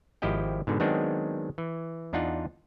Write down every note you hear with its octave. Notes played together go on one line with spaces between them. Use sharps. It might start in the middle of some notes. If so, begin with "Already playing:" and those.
G#1 F3 E4 G4 D#5 G5
G#2 B2 D3
D#3 F#3 G#3 B3 C4 D4
E3
E2 D4 D#4 F4 F#5